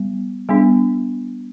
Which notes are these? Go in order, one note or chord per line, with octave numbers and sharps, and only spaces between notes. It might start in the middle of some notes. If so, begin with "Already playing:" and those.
Already playing: G3 B3
G3 B3 D4